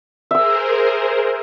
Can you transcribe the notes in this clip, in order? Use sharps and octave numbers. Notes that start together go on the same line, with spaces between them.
G#4 A#4 C5 E5 E6